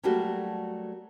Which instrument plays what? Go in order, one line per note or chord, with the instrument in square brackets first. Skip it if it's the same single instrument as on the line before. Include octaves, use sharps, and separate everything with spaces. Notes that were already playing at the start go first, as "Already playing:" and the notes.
[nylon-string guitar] F#3 G3 A3 A#3 F#4 G4